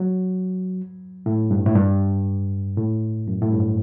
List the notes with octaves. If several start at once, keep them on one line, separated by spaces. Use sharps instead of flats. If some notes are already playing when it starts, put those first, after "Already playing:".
Already playing: F#3
A2
G2
A2
G2
A2
F#2
A2
G2